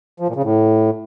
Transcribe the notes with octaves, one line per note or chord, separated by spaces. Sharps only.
F3
A#2
C#3
A2